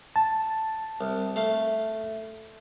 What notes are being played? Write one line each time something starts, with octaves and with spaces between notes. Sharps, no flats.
A5
C2
A3 F5